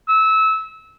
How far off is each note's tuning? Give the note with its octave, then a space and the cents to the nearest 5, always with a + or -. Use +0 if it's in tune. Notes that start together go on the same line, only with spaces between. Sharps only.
E6 -20